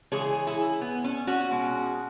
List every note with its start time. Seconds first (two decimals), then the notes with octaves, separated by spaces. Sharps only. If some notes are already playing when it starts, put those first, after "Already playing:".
0.12 C#3 E3 G#3 G#4 C#5
0.47 E4 G#4
0.81 B3
1.04 C#4
1.27 C#4 F#4
1.51 B2 G#3